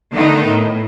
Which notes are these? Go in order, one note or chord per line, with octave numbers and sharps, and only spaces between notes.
D3 D#3 A3 B3 D#4
A2